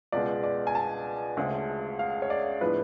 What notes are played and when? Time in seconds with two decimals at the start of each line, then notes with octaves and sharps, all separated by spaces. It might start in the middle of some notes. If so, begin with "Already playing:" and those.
0.12 C#2 B2 G#3 D5
0.44 D5
0.67 G#5
0.75 A5
1.37 D2 C#3 G#3 C#4
1.99 F5
2.22 C#5
2.30 D5
2.61 A2 F3 G#3 B3 D4 B4